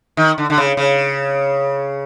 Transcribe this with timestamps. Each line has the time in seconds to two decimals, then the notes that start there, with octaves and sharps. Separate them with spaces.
0.17 D#3
0.38 D3
0.50 D3
0.58 C#3
0.77 C#3